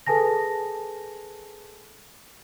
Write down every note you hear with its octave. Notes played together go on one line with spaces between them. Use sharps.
G#4 A4 B4 G#5 A5 A#6